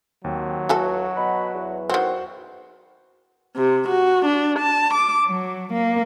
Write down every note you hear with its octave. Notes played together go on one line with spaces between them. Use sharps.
D#2 F#3 C4
C#2 E3 F#4 A4 A5
B2 B5
E2
D#3 C4 F#4 C5 F#5
C3
F#4
D4
A5
D6
F#3
A#3